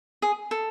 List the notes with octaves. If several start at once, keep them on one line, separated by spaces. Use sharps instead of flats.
G#4
A4